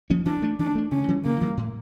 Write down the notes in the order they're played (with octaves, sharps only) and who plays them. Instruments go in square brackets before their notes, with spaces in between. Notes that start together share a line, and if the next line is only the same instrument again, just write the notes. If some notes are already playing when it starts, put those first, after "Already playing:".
[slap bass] F3 A#3 C#4
[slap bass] E3 [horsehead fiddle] D4
[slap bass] A3 D4
[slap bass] E3 [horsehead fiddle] D4
[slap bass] A3 D4
[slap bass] C#3 [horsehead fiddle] C#4
[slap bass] E3 G3
[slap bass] C#3 [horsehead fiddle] A#3
[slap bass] E3 G3
A2